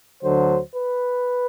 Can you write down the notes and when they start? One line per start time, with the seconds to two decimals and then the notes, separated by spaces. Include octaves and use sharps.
0.23 D2 D3 F#3 C5
0.74 B4